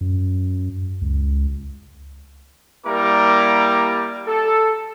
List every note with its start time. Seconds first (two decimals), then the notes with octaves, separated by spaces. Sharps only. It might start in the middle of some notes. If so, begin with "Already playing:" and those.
0.01 F#2
1.01 C#2
2.85 G3 A#3 E4 A#4 A#5 D6
4.26 A4